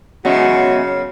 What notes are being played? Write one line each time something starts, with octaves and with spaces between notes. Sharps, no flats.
F#2 C#3 B3 F#4 D#5 E5